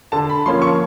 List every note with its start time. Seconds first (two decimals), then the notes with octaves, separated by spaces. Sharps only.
0.12 D3 A5
0.29 B5
0.46 F3 A#3 C#4 C6
0.62 C#6